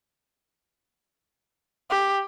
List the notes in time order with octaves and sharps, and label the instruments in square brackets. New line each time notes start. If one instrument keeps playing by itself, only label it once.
[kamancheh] G4